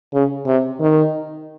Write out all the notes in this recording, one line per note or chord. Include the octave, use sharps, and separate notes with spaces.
C#3
C3
D#3